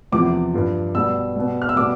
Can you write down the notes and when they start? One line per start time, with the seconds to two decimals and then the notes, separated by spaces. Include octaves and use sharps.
0.12 E2 C3 F3 D6
0.54 G2 F3
0.95 B2 G3 E6
1.35 B2 G3
1.62 F6
1.69 E6
1.76 B2 G3 D6